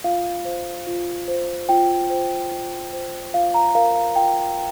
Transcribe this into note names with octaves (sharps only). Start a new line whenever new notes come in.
F4 F5
C5
F4
C5
F4 G5
C5
F4
C5
F4 F5
A#5
A#4 F5
F5
F4 G5